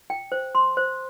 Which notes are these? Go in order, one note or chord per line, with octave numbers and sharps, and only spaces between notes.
G5
C5
C6
C5